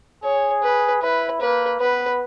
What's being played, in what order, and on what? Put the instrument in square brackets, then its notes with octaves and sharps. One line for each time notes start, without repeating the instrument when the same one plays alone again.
[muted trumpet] G#4 [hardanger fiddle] C#5
[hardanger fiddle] B4
[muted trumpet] E4 [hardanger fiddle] B4
[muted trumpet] A#3 [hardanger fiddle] B4
[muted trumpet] B3 [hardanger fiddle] B4